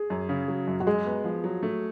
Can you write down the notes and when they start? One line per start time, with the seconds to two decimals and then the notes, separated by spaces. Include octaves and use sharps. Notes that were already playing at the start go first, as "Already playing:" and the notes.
Already playing: G#4
0.10 F#2
0.29 C#3
0.48 F#3
0.67 F#2
0.80 F#4
0.87 G#3 G#4
1.06 B3
1.24 F3
1.44 F#3
1.63 A3